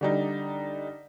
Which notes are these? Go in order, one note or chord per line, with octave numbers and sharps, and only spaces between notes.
D3 G3 D#4